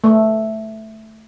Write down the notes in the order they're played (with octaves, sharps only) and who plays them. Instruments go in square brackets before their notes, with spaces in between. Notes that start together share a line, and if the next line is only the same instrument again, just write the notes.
[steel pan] A3